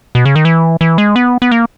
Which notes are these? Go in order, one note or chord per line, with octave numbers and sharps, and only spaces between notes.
B2
C#3
D#3
E3
E3
G#3
B3
B3
A#3